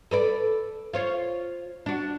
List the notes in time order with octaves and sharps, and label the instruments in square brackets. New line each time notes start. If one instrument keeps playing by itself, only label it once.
[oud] A4 B4 D5
F4 C5 C#5
D4 F#4